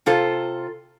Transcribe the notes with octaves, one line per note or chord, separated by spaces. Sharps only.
C3 F4 A4 C5